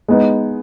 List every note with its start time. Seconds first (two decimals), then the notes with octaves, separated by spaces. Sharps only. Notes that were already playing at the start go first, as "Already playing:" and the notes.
0.08 G#3 B3 D#4